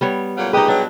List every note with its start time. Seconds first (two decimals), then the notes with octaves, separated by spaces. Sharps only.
0.01 G3 B3 C#5
0.37 A#2 C#3 F#3
0.53 A#2 D#4 G4 G#4 B4 D#5 G5
0.68 B2 F#3 D4